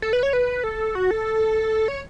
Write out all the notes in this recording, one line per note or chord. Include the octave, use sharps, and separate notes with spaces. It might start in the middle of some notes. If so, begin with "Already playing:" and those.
A4
B4
C#5
B4
A4
F#4
A4
C#5